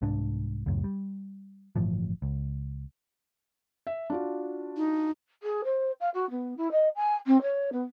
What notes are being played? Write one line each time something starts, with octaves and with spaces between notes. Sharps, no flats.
C2 G#2 D4
C#2 F#2 A2
G3
G1 A2 E3 F3
C#2
E5
D4 F4 F#4
D#4
G#4
C5
F5
F#4
B3
E4
D#5
G#5
C4
C#5
B3